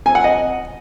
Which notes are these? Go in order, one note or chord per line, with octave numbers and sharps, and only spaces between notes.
G#5
F#5
D#5